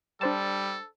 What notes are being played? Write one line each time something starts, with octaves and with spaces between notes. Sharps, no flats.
G3 D4 A4 C5 A5